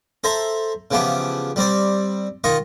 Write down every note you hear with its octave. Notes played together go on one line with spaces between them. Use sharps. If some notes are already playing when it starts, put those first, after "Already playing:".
A4 C5 E5 A#5
C#3 E3 F3 B3 G4
G3 C4 D5
D#3 F4 D#5 C#6